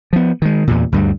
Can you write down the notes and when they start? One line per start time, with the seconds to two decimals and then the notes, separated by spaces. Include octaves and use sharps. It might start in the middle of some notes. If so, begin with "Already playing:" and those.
0.13 F3 B3
0.42 D#3 G#3
0.67 E2 G2 A#2
0.92 D2 G2 G3